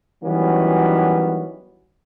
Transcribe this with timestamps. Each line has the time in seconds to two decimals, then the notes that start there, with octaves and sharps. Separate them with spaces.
0.24 D#3 E3 F#3 G3 B3 C#4